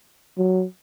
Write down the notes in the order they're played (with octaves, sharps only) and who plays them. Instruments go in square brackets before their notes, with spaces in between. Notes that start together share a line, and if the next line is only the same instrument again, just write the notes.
[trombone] F#3